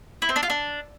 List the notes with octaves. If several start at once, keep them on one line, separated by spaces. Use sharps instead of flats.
E4
C4
D4
F4
D4